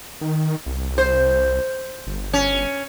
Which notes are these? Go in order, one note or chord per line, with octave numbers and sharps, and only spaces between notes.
D#3
C2
C5
G1
C#4